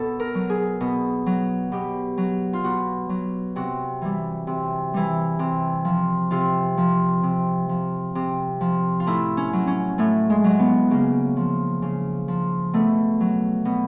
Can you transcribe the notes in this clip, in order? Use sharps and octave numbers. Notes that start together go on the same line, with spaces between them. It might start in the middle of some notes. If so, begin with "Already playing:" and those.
Already playing: B2 A4
A#4
F#3
G#4
B2
F#3
B2 G4
F#3
F4
B2 F#4
F#3
C3 F#4
E3 G3
C3
E3 G3
C3
F3
C3 F4
F3
C3
F3
C3
F3
F4
A2 E4
C#4
F#3
C#4
A2 A3
G#3
F#3
B3
C#3 A#3
F3
C#3
F3
B2 A3
F#3
B2